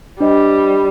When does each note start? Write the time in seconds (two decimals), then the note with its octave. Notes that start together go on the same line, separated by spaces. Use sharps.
0.20 G3 D4 C5 D#5